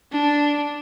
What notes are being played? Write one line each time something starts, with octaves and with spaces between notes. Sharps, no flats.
D4